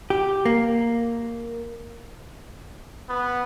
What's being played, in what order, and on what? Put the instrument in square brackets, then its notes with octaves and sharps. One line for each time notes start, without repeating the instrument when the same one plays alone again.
[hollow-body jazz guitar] G4
A#3
[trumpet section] B3